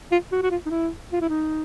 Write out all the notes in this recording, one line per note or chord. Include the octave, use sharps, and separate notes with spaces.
F4
F#4
F#4
F4
D#4
E4
F4
E4
D#4